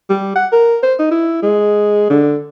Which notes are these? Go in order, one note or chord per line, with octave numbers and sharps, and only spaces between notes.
G3
F#5
A#4
C5
D#4
E4
G#3
D3